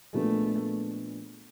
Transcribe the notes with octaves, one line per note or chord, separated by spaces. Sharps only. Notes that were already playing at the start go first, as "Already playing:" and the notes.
A#2 F3 G#3 A3 B3 D4